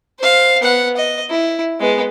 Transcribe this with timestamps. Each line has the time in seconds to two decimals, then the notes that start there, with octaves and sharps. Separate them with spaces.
0.19 C5 F5
0.62 B3 F#5
0.96 D#5
1.29 E4
1.80 G#3 B3